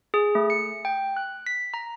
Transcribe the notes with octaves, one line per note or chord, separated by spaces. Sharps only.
G#4
A3
C#7
G5
F#6
B6
A#5